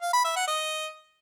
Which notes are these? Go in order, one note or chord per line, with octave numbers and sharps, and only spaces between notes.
F5
B5
E5
F#5
D#5